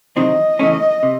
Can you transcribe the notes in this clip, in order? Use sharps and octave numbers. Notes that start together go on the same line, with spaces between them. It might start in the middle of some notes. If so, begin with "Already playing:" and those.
C3 D#3 F#3 C4 D#5
E2 C#3 E3 A3 C#4
C3